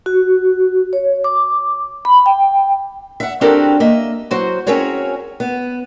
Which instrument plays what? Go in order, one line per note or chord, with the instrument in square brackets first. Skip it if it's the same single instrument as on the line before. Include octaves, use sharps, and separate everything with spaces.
[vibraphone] F#4
C#5
D6
B5
G5
[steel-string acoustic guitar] E5 F#5
C4 D4 F#4 G4 A4 A#4
A#3 D#5 E5
F#3 F#4 C5
C4 C#4 F#4 G#4 A#4 C#5
B3